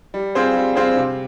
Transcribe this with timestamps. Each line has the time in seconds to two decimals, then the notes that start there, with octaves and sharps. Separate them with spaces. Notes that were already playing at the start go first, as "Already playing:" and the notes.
0.14 G3
0.35 C4 F4 G#4 C5
0.55 G3
0.75 C4 F4 G#4 C5
0.97 C3